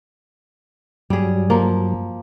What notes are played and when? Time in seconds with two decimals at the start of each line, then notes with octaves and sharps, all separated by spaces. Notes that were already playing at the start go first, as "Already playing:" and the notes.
1.10 G2 F#3 G3 G#4
1.50 F3 A#3